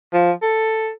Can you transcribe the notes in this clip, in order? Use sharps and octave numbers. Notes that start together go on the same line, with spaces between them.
F3
A4